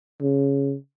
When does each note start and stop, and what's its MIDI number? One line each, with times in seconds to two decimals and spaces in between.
0.22 0.75 49